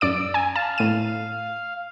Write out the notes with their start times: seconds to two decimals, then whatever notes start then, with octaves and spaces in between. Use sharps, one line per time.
0.01 F#2 D5 E6 D7
0.34 G#5
0.56 F5 A5
0.78 A2 D#7